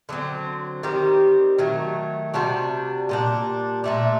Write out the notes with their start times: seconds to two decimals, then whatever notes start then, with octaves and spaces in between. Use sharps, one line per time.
0.09 D3 F#3 C4
0.83 D#3 G3 C4 G4
1.58 D#3 F#3 A3
2.34 C3 G3 D4 F#4
3.09 A#2 G3 D4
3.84 A#2 A3 D4